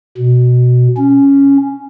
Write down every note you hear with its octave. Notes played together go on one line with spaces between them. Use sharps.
B2
C#4